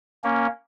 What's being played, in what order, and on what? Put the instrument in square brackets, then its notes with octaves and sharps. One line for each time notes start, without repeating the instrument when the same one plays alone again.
[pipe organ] A#3 C#4